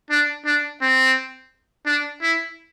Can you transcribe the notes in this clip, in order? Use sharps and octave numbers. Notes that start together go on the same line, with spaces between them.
D4
D4
C4
D4
E4